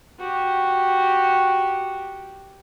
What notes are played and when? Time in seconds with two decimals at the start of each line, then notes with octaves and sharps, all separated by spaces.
0.19 F#4 G4